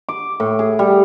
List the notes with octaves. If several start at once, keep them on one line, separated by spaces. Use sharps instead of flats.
D6
A2
G#4
G3